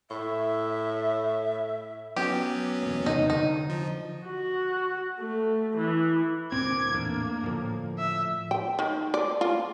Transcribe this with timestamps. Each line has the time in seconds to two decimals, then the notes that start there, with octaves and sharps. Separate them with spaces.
0.10 A2 E5
2.16 F#3 B3 C#4 G4
2.83 E1 A#3
3.06 E2 C3 D#4
3.30 D3 D#4
3.70 F3
4.26 F#4
5.21 A3
5.77 E3
6.52 D2 A#2 C4 D6 G#6
6.93 E2 A2 A#3 D4
7.44 A2 D3 F3
7.98 E5
8.51 G5
8.79 D#3
9.14 D5
9.41 F4